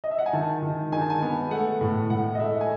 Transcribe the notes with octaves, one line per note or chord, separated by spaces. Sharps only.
D#5
E5
F#5
G#5
D#3 A5
D#3
D#3 G#5
A5
G#5
B3
A3 F#5
A2
A2 F#5
D#5
A3 E5
G#5